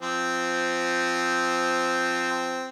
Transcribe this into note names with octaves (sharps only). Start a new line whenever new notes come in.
F3 C4